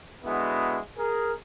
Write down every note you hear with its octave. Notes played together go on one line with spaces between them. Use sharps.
D3 G#3 B3 E4 F#4
G#4 A#4